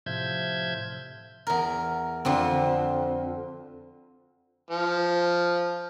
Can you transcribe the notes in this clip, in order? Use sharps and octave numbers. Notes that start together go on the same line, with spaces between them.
A2 C3 F3 E5 G6 G#6
E2 A#4
F2 D3 C4
F3